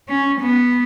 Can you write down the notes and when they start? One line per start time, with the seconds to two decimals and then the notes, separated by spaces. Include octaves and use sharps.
0.09 C#4
0.40 B3